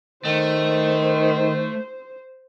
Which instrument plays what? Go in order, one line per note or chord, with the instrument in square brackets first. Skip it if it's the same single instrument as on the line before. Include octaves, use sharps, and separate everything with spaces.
[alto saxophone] D#3 [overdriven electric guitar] A3 [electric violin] C5